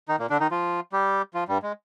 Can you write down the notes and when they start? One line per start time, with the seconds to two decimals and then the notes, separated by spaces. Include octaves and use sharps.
0.09 D#3 D#4
0.19 A#2 A#3
0.30 D3 D4
0.40 D#3 D#4
0.51 F3 F4
0.93 G3 G4
1.34 F3 F4
1.48 G2 G3
1.63 G#3